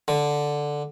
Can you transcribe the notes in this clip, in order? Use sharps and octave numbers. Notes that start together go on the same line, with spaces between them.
D3